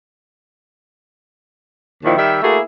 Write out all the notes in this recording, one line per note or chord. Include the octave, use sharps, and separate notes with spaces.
D#2 A#2 D#3 F3 E4
D#3 G3 E5
A3 A#3 E4 F#4 G#4